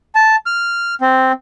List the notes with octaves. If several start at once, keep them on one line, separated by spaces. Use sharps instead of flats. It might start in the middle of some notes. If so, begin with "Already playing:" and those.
A5
F6
C4